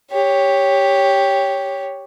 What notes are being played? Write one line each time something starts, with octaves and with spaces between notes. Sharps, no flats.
G4 C#5